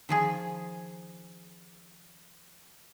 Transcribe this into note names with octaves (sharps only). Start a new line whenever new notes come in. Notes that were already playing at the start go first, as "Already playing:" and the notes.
D#3 F3 G#4